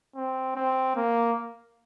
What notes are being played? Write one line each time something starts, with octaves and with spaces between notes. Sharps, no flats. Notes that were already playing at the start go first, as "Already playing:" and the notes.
C4
C4
A#3